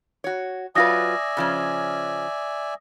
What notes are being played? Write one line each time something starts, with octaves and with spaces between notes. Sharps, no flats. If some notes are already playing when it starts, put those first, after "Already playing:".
F#4 C#5
F#3 F4 B4 D5 E5 G#5 D#6 A#6
C#3 F3 C#4